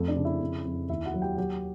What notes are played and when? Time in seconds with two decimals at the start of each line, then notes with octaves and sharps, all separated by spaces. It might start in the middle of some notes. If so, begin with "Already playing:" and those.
Already playing: F2 F3 A3 A4
0.08 D4 D5
0.16 C#3
0.25 E4 E5
0.41 F2
0.65 F2
0.89 D#2 E4 E5
1.05 F#4 F#5
1.14 F#3
1.21 G4 G5
1.38 F#3 G4 G5